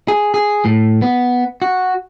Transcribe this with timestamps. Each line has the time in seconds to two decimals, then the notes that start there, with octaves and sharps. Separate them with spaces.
0.08 G#4
0.34 G#4
0.65 A2
1.02 B3
1.62 F#4